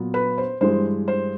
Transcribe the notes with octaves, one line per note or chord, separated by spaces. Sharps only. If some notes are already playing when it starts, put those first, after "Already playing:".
Already playing: A#2 F#3 B3
B4
C5
G2 E3 G#3 C5
C5